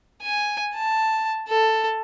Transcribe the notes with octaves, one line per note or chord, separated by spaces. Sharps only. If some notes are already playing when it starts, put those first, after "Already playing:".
G#5
A5
A4